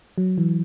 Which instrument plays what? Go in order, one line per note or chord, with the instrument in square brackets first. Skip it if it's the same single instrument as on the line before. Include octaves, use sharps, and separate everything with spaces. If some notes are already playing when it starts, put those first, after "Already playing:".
[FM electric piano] F#3
E3